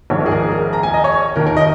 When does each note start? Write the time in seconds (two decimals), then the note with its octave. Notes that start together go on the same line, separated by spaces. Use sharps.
0.10 A#1 G#2 D#3 C#5
0.21 A#4
0.26 G#4
0.31 A#4
0.42 G#4
0.52 A#4
0.73 A#5
0.83 G#5
0.94 D#5
1.04 C#5
1.36 D#2 D#3 A#4
1.47 A#4
1.57 D#5